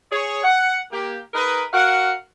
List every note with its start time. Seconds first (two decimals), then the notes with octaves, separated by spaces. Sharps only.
0.11 G#4 C#5
0.43 F#5
0.92 A#3 G4
1.34 D#4 G#4 A#4 B4
1.73 F#4 A#4 F5 F#5